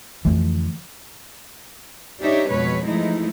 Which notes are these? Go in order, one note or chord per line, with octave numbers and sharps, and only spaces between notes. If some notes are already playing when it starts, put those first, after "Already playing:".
F2 D3 E3 A3
D4 D#4 G4 C#5 E5
F2 B2 F#3 G#3 B4 C#5
E3 F3 G#3 A3 D#4 E4